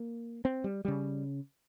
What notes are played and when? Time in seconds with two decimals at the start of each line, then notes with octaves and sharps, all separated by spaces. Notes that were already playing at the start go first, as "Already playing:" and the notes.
Already playing: A#3
0.45 C4
0.64 G3
0.85 C#3 G3